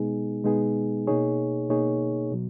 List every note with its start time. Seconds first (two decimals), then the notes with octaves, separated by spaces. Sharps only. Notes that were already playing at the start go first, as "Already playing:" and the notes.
Already playing: B2 G#3 B3 D#4 G#4
0.44 B2 G#3 B3 D#4 G#4
1.07 B2 A#3 D#4 G#4 C#5
1.69 B2 A#3 D#4 G#4 C#5
2.32 B2 F#3